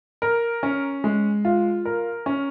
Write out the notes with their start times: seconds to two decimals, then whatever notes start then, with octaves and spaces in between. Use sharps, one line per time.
0.22 A#4
0.63 C#4
1.04 G#3
1.45 F4
1.85 A#4
2.26 C#4